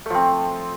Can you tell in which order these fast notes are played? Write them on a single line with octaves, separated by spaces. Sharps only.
A3 F3 C4